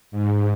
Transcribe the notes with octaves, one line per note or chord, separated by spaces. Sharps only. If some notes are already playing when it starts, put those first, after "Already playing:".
G#2